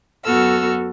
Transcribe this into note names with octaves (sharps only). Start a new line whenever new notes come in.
F#2 B3 F#4 A4 E6 F6